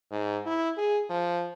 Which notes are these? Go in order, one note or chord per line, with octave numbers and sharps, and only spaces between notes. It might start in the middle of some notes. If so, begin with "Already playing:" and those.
G#2
E4
G#4
F3